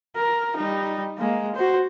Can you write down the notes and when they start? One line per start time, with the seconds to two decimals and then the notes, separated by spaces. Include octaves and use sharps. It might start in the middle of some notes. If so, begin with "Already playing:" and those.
0.16 A#4
0.56 G3 D#4
1.19 G#3 A#3
1.55 F#4 C5